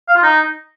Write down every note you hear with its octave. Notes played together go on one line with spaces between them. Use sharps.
F5
F4
D#4